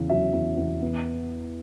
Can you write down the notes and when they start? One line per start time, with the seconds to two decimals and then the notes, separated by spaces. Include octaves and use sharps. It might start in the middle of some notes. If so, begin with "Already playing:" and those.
Already playing: E2 C#3
0.09 F#3 E5
0.33 E2
0.58 E2
0.82 B3